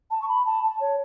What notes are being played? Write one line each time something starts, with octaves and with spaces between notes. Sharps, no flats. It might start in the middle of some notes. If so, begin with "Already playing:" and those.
A5
C#6
B5
A5
A5
C#5